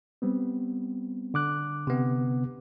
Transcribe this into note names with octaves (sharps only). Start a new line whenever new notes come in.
G3 B3 C4
D3 D6 F#6
C3 B3